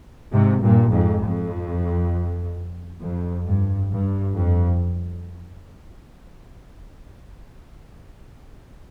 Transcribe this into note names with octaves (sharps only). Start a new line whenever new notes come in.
G#2 C3
G2 A#2
F2 G#2
F2
F2
G2
G2
F2